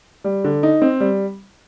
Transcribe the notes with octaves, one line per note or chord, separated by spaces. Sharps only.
G3
D3
D#4
C4
G3